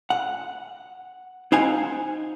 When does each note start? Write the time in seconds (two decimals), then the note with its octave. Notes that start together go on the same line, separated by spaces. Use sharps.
0.10 F#5
1.52 D#4 C5 F5 F#5 G#5